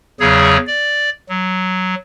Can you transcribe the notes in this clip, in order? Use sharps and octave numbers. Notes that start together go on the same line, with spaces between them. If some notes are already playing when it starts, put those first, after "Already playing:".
E2 C#3 F#3 G#4 C#5
D5
F#3